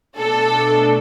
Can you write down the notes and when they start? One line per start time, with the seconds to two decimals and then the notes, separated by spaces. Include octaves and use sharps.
0.17 B2 A3 D4 A4